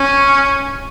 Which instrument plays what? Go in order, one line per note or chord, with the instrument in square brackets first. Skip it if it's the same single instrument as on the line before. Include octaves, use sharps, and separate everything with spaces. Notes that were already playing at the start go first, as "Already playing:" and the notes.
Already playing: [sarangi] C#4